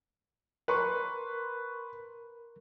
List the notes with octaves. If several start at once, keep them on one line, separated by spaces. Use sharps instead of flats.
A#4 B4 C6 C#6